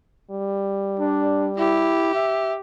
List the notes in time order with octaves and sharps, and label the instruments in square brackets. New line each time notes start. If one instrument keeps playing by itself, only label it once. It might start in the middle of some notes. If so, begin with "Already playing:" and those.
[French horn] G3
[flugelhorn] D4
[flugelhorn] E4 [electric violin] G4
[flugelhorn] E5